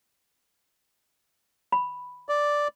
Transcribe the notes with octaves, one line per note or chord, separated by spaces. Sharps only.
B5
D5